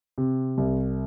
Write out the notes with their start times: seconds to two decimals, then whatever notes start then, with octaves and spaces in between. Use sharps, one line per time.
0.18 C3
0.58 C2